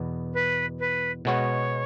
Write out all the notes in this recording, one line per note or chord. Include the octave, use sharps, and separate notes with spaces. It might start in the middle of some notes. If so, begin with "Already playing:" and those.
Already playing: E2 B2 B3
B4
B4
B2 G#3 B3 F#4 C#5